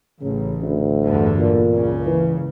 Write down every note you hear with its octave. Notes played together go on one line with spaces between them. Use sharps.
A1 C#3
D2
E2 G2 D3
A#2
C#2 C#3
E3